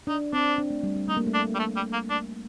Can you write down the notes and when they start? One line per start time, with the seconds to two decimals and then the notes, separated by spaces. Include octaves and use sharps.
0.07 D4 D#4
0.33 C4 D4
0.58 D4
0.70 A3
0.83 G3
0.96 G3
1.08 A3 D#4
1.17 A#3
1.27 A3
1.34 D4
1.55 G3
1.59 A3
1.76 G3
1.93 A#3
2.10 D4